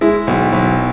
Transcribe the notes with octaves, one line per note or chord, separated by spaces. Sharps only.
G#3 E4
B1
B1